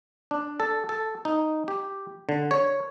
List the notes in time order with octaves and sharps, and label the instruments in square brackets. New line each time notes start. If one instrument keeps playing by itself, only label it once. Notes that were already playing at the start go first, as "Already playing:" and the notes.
[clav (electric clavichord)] D4
A4
A4
D#4
G4
D3
C#5